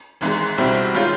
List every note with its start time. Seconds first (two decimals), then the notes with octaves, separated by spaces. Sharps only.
0.21 G#1 G#2 E3 G#3
0.58 C2 B2 G3 C4 E4
0.94 D#3 G#3 C#4 F4